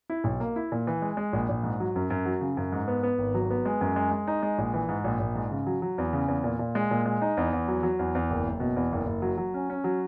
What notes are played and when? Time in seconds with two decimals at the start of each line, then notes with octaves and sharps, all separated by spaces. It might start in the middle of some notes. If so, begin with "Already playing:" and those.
0.10 E4
0.24 B1
0.40 A#3
0.56 E4
0.72 A#2
0.87 E3
1.02 G#3
1.17 G#3
1.33 A#1
1.49 A#1
1.63 G#2
1.80 F#3
1.96 F#2
2.10 F#2
2.26 F#3
2.41 C#3
2.57 F#2
2.72 G#2
2.88 B3
3.03 B3
3.18 G#1
3.35 F#3
3.50 B3
3.65 G#3
3.81 F#2
3.96 G#3
4.11 G#3
4.27 D#4
4.43 G#3
4.58 A#1
4.74 E3
4.89 G#2
5.04 A#1
5.20 A#1
5.35 G#2
5.51 C#3
5.67 F#3
5.82 F#3
5.98 E2
6.13 C#3
6.28 E2
6.44 A#2
6.59 A#2
6.75 G#3
6.91 A#2
7.06 G#3
7.22 D#4
7.37 E2
7.53 E2
7.68 F#3
7.83 F#3
7.99 E2
8.15 E2
8.30 F#1
8.46 F#1
8.60 B2
8.76 E2
8.92 F#1
9.07 F#1
9.22 F#3
9.38 F#3
9.54 C#4
9.70 C#4
9.84 F#3